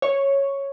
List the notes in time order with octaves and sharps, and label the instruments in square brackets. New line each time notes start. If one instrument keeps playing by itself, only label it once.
[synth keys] C#5